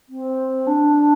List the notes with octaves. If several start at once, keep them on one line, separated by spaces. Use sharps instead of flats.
C4
D4